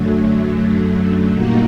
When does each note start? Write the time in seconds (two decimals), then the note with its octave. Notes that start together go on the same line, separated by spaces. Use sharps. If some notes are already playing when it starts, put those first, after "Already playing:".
Already playing: F#2 D3 F#3 A3
1.30 A#2 G3 A#3 D#4 F#4